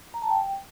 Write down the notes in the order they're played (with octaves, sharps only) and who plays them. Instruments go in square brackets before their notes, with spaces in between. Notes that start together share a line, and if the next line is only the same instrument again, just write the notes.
[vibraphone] A#5
A5
G5